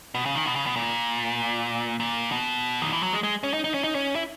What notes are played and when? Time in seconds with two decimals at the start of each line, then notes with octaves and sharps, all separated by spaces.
0.14 B2
0.26 C#3
0.35 D#3
0.45 B2
0.56 C#3
0.66 B2
0.76 A#2
2.00 A#2
2.31 B2
2.82 D#3
2.93 E3
3.03 F#3
3.13 G#3
3.23 G#3
3.43 C#4
3.53 D#4
3.64 D#4
3.74 C#4
3.84 D#4
3.95 C#4
4.15 E4